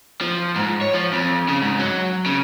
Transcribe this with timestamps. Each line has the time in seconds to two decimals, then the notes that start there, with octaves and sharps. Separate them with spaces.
0.21 F3
0.56 G#2
0.81 C#5
0.93 F3
1.13 F2
1.48 C#3
1.62 G#2
1.79 F#3
2.26 C#3